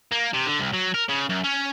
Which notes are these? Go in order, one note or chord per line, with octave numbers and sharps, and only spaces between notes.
A#3
C3
D3
C2
F#3
A#4
C#3
F#2
C#4